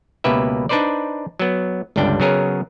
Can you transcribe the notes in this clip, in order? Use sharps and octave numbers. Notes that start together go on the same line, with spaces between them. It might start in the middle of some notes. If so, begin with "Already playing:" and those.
C#2 B2 A#3 G4 B4 E5
D4 D#4 B4 C5 D5
F#3 B3
G1 C#2 G3 D4 G5
C#3 F#3 B3 G#4 A#4 C#5